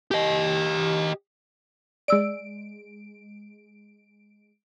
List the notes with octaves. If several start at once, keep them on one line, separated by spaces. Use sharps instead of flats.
G4 D#5
G#3 D5 E6 D7